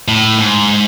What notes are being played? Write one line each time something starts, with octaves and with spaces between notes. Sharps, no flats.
A2
G#2